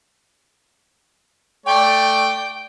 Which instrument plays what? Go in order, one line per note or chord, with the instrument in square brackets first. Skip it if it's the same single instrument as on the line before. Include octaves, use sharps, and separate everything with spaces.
[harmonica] A3 D5 [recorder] G5